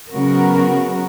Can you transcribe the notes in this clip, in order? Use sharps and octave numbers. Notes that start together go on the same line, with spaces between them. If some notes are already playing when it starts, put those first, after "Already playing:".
C#3 F#3 B3 F#4 A#4